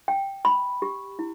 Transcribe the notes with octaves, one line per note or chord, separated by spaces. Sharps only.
G5
B5
G4
E4